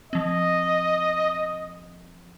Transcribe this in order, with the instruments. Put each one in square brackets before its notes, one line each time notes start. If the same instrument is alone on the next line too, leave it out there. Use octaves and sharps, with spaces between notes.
[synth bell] F3 C4 [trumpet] D#5